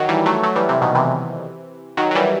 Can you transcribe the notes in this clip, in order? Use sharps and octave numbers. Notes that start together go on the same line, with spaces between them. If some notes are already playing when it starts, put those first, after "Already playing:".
Already playing: D#3 F#3
E3 G3
F#3 A3
F#3 A3
E3 G3
C3 E3
B2 D#3
C3 E3
D#3 F#3
F#3
E3 G3